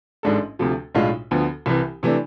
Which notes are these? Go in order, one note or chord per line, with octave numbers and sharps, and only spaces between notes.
A1 G#2 G#3 D4 A4
D2 C3 F3 A3
B1 A2 G#3 D4 F4
D2 D3 F3 B3
C2 C3 E3
C3 E3 A3 D4